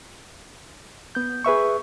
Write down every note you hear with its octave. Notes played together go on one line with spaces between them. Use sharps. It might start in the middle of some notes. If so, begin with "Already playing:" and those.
B3 G6
G#4 B4 E5 C#6